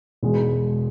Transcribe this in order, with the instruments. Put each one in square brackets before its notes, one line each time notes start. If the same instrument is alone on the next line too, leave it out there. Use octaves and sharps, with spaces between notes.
[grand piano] E1 E2 B2 G#3